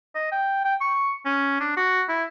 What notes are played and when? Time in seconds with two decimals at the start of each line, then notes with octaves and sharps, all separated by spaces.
0.15 D#5
0.32 G5
0.65 G5
0.81 C#6
1.26 C#4
1.61 D4
1.77 F#4
2.09 E4